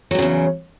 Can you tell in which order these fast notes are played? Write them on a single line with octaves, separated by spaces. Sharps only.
F#3 G2 C#3 E2